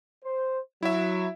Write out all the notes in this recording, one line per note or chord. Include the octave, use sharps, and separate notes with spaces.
C5
F#3 E4 E5